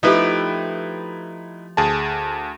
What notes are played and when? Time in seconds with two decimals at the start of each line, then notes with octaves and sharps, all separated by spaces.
0.03 F3 A3 D#4 E4 G4 B4
1.77 D2 G#4 A5